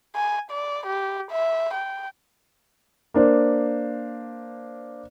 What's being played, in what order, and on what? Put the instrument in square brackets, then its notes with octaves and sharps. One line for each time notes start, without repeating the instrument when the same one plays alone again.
[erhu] G#5
D5
G4
E5
G5
[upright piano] A#3 D4 C5